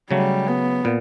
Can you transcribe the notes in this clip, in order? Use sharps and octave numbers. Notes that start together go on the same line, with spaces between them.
C#3 F#3 G3 A3
B3
A#2